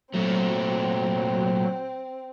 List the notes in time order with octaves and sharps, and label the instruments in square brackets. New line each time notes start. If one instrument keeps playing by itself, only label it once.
[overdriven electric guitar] A#2 A3 [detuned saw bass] F#3 [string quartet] C4